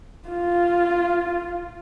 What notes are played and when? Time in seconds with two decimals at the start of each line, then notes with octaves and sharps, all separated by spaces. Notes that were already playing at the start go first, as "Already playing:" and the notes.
0.29 F4